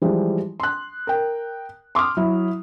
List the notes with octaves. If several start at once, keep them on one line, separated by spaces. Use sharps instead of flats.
E3 F3 G3 G#3
C6 F#6
A#4 G5
C6 D6 D#6 F6
F#3 E4